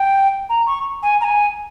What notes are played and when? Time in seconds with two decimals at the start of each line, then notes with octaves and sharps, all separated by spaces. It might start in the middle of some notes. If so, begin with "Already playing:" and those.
Already playing: G5
0.49 A#5
0.67 C#6
1.03 G#5
1.21 A#5
1.24 G#5